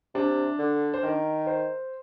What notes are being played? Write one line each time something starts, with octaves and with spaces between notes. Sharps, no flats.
C3 D4
D3
C5
D#3 A#4
C5